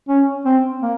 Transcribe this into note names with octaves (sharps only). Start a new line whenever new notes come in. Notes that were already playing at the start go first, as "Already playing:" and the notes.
C#4
C4
A#3